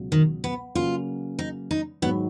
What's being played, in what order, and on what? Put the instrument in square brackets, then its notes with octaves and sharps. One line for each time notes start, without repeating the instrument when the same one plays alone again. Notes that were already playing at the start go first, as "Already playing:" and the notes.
Already playing: [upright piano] C#2 B2 F#3
[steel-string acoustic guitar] D#3
B3
[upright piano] C#3 F#3 A#3 C#4 [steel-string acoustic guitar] F4
[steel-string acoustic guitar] D#4
D#4
[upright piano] G#2 D#3 F#3 [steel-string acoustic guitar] B3